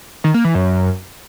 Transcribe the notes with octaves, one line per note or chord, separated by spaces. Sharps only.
D#3
A#3
E3
F#2